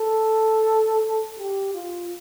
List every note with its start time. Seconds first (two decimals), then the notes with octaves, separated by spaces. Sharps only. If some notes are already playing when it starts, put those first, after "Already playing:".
Already playing: A4
1.38 G4
1.74 F4